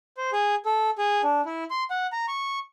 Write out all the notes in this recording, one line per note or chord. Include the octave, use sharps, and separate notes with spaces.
C5
G#4
A4
G#4
D4
E4
C6
F#5
A#5
C#6